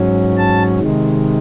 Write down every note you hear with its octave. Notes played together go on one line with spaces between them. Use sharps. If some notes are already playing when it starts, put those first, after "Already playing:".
Already playing: G#2 F#3 C#4
A5
C3 D#3 G#3